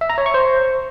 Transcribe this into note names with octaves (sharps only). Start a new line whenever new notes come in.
E5
A#5
C#5
C#6
C5